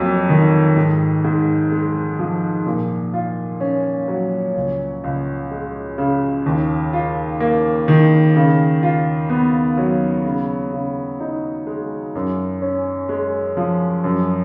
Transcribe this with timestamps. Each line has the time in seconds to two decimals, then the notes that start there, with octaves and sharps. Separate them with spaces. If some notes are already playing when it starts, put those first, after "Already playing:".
Already playing: F2 F#3 A#3
0.29 D#3
0.76 G#2
1.24 G#2
1.72 G#3
2.19 F3
2.66 A#2
3.14 F4
3.61 C#4
4.08 F#3
4.56 C#2
5.04 C#2
5.51 G#3
5.98 C#3
6.46 D#2
6.93 F4
7.40 A#3
7.88 D#3
8.36 C#3
8.83 F4
9.30 B3
9.78 F#3
10.25 C#3
10.73 C#3
11.20 D#4
11.67 G#3
12.15 F#2
12.62 C#4
13.09 G#3
13.57 F3
14.04 F#2